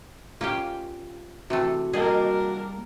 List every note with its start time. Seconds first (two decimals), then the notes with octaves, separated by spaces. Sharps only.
0.41 A#3 C#4 F4 G4
1.50 C3 E3 A3 F#4
1.93 G3 A#3 D4 G#4 A#4 D#5